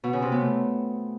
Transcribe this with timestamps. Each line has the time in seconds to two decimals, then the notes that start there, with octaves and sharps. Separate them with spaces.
0.04 B2
0.13 C#3
0.22 C3
0.32 B3
0.41 A3